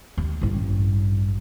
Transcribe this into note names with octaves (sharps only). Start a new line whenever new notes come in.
D#2
A1 G2